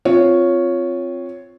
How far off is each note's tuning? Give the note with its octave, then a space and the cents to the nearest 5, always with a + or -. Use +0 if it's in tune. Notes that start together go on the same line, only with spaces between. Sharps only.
C4 +0 F4 +0 C#5 +0